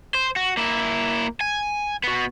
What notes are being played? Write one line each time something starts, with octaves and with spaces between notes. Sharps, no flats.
C5
F#4
A#3 E4
G#5
B3 F#4